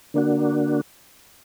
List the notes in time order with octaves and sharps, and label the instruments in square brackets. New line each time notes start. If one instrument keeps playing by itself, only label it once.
[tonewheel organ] D3 A#3 D4 F#4